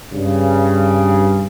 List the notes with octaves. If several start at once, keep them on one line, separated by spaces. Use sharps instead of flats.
G2 C#3